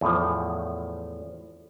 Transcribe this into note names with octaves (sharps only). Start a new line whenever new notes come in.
E2 A2 F3